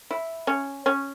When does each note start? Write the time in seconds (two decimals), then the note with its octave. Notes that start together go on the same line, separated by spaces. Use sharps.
0.11 E4
0.47 C#4
0.86 C#4